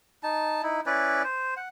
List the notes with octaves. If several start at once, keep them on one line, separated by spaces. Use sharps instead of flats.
D#4 A5
D#4 E4
C#4 E4 B4 D5
C5
F#5